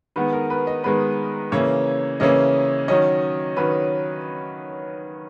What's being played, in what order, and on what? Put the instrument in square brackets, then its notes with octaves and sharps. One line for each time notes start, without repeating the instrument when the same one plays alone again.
[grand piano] D#3 G#3 B3 B4
A#4
B4
D#5
D#3 G#3 B3 B4
C#3 E3 A#3 C#4 C#5
C#3 E3 A#3 C#4 D#5
D#3 F#3 C#4 D#5
D#3 F#3 C#4 B4